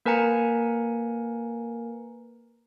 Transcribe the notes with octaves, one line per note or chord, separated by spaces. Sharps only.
A#3 A#4 B4 G#5 A#5 C#7